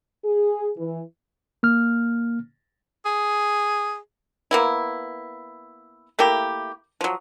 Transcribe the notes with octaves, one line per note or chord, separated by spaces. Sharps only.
G#4
E3
A#3 F6
G#4
A#3 B3 E4
A3 A#3 E4 G4
F3 F#3